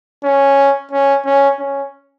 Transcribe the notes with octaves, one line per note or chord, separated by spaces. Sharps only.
C#4
C#4
C#4
C#4